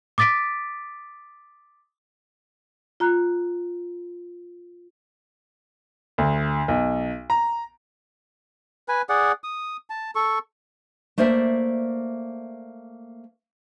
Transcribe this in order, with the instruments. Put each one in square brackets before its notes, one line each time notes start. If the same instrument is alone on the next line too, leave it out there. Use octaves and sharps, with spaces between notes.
[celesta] D6 D#6 A6 B6 D7
[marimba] F4 A#5 F#6
[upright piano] D2
B1
A#5
[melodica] B4 G#5
G#4 D5 F#5
D#6
A5
A4 C#6
[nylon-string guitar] A3 A#3 C5 D5 E5